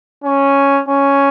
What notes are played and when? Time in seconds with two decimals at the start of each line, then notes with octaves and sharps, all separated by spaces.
0.24 C#4
0.88 C#4